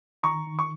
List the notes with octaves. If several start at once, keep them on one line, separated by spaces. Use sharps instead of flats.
D#3 A#5 C#6
D#3
C#6